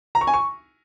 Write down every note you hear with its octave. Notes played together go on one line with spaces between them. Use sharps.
A#5
C#6
G#5
C#6